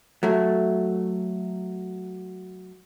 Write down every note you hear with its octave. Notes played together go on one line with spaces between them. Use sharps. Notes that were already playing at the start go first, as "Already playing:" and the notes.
F#3 A3